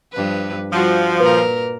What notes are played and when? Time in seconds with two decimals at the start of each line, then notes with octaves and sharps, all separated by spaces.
0.12 G2 F3 B4
0.72 F3 G3 F#4
1.20 A#2 A#4 B4